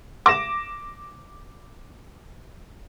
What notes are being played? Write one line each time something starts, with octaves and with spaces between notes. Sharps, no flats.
D6 A#6 E7